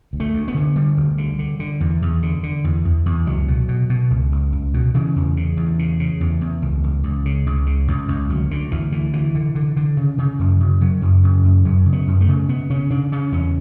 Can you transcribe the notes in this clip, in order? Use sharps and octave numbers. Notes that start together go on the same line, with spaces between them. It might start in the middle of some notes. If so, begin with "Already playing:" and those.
D2
A3
D2
B3
D3
D3 G3
D2
D3
D3
D3
E2
E2
D3
D3
E2
E2
E2
C#2 F#3
B2
B2
B2
C#2
C#2
C#2
B2
C#3 E3
E2
C#3
E2
C#3
C#3
E2
E2
C#2
C#2
C#2
C#3
C#2
C#3
C#2
C#2
D2 F#3
D2 D3
D2 E3
D3 E3
D3 E3
D3
D3
D3
C#3
C#3
F#2
C#3
C#3 F#3
F#2
C#3
F#2
F#2 F#3
C#3
B3
F#2
A3
C#3
C#3 B3
C#3 C#4
C#3 D4
C#3 C#4
E2 C#4